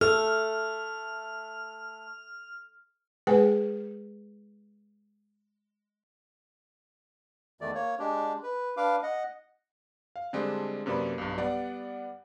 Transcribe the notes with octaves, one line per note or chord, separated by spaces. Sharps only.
A3 A4 F6
G#3 G#4 B4 G5 G#5
E2 D#3 A3 D5
A#3 C#5
G#3 D4 G4
B4
D4 B4 F5 D6
D#5 F#5
F5
D3 G3 G#3 C4 D4
F#2 C3 A#3 B4 D5 B5
B1 G2
G3 B3 D5 F#5